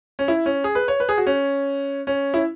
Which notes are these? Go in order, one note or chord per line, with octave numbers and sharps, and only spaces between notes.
C#4
E4
C#4
G#4
B4
C#5
B4
G#4
F#4
C#4
C#4
E4